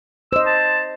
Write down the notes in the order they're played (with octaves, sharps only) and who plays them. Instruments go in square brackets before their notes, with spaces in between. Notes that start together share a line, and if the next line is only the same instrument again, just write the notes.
[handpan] C5 D#5 [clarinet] E6
[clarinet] A5